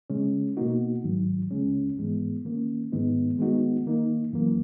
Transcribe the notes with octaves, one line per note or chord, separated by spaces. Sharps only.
C#3 G#3 C#4
B2 A#3 D#4 F#4
G#2 D#3 F#3
C#2 C#3 G#3 C#4
G#2 E3 G#3 B3
D#3 A#3 C#4
G#2 D#3 G#3 B3 D#4
D#3 G#3 B3 D#4 F#4
D#3 A#3 D#4
F#2 E3 A#3